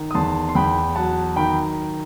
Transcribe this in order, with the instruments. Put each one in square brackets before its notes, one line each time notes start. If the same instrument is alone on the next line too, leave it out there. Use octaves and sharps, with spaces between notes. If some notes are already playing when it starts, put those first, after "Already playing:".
Already playing: [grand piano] D#3
D#6
E2 A5 C6
C6
E2 G5 B5
F#3 F#5 A5
D#3 G5 B5